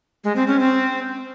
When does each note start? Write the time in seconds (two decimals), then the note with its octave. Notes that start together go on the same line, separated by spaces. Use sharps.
0.24 G#3
0.36 C4
0.48 C#4
0.59 C4